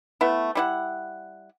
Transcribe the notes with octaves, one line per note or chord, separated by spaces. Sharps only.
A3 B3 E4
G3 E4 F#5